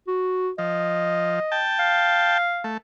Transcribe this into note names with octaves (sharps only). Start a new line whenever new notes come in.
F#4
F3 D#5
G5 A5
F5
A3